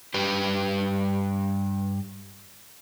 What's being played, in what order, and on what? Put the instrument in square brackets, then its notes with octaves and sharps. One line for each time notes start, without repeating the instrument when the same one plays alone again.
[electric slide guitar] G2 G4 B4